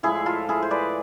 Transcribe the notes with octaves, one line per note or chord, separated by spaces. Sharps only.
A2 F3 G#3 E4 G#4
F4 A4
E4 G#4
C5
B4 D5